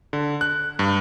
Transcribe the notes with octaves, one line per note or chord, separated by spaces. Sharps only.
D3
F#6
G2